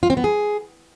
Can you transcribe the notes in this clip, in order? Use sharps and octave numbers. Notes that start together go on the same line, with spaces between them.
F4
C4
B3
G#4